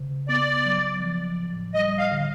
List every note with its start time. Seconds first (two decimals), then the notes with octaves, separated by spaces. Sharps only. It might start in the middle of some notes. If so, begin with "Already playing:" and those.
Already playing: C#3
0.28 B3 D5
0.65 F#3
1.01 F3
1.38 A2
1.74 G3 D#5
1.98 F5
2.12 D3